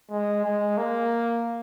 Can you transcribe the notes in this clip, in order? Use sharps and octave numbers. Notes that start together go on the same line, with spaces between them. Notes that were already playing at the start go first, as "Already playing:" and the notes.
G#3
G#3
A#3